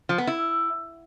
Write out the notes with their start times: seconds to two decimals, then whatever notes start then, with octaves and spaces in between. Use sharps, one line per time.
0.09 F3
0.18 B3
0.27 E4